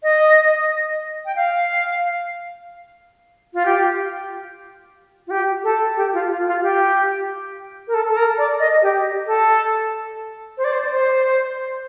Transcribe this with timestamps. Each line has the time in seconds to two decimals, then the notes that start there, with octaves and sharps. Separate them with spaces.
0.03 D#5
1.26 G5
1.36 F5
3.54 F4
3.66 G4
5.27 F4
5.31 G4
5.64 A4
5.96 G4
6.13 F4
6.30 F4
6.47 F4
6.62 G4
7.88 A#4
7.94 A4
8.09 A4
8.17 A#4
8.38 D5
8.60 D#5
8.82 G4
9.26 A4
10.58 C5
10.64 D5
10.73 C5
10.85 D5
10.91 C5